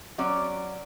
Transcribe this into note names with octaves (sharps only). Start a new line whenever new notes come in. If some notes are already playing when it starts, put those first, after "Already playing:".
F#3 C#4 D5